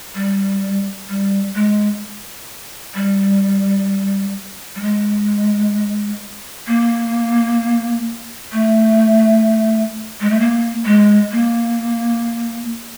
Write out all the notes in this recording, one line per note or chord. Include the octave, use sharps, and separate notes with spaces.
G3
G3
G#3
G3
G3
G#3
A#3
A3
G#3
A3
A#3
G#3
A#3